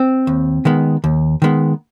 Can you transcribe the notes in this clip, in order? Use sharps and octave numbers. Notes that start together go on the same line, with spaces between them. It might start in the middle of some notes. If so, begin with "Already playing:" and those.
Already playing: C4
D#2
D#3 G#3 B3
D#2
D#3 G#3 B3